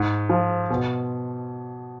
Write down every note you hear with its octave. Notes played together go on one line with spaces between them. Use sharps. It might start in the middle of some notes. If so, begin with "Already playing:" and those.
Already playing: G#2
F3
B2